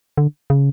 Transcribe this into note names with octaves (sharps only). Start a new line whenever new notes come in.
D3
C#3